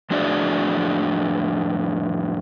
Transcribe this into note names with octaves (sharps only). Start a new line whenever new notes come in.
F2 A2 D4 F#4 G#4 D5